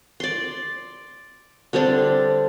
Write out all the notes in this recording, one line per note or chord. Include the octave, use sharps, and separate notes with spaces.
D5 C6
D3 G3 C4 D4